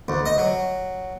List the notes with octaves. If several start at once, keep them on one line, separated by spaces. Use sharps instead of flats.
D2
D#5
F#3